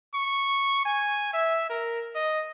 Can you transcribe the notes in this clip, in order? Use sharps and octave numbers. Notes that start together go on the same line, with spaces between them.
C#6
G#5
E5
A#4
D#5